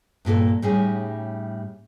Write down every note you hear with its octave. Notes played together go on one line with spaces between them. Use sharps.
G2 A#2 G4 A4
A2 G3 C#4 D#4 G#4